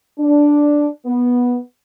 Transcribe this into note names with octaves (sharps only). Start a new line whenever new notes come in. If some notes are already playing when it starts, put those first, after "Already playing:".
D4
B3